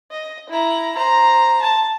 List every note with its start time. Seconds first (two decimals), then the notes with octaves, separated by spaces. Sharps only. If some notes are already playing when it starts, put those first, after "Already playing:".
0.11 D#5
0.49 E4 A#5
0.96 C5 A#5
1.63 A5